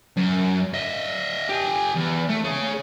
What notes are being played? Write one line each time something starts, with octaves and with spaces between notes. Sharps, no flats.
F#2
D#5 E5
G4 G#5
E2
A3
G#4 C#5